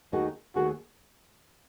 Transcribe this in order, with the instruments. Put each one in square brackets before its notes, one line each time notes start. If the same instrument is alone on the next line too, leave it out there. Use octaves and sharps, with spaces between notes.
[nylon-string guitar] D#2 D#3 A3 D#4 G#4 [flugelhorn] F#4
[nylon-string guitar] D#2 D#3 A3 D#4 G#4 [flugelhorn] F#4